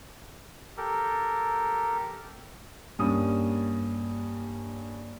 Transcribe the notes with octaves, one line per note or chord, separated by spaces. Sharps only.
G4 A4 A#4
G2 A#3 C#4 D#6